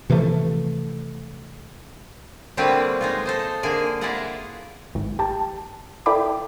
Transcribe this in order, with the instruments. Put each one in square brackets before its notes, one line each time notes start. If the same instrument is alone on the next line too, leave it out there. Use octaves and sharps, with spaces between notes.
[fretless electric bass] C3 E3 F3 A3
[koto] D3 G3 A#3 C4 F#4 B4
G#3 D#4 F4
A4 C5 D#5
D3 A#3 G#4 G#5
E4 F4 G#4 D5 D#5 F#5
[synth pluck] G#1 G#2
G4 A5
E4 A4 D5 G5 B5 D6